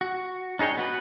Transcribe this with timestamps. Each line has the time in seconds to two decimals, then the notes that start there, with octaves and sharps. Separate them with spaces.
0.01 F#4
0.59 D4 D#4 G#4 C#5 G5
0.77 B3 F#4 B4